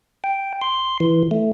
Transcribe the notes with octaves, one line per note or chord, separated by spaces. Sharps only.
G5
C6
E3
A3